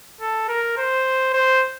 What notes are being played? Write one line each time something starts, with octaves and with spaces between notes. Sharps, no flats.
A4
A#4
C5
C5